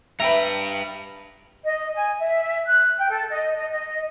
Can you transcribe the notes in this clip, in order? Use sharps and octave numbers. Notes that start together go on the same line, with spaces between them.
G2 B4 E5 G5 A#5
D#5
G#5
E5
F#6
G5
A4
D#5
D#5
D#5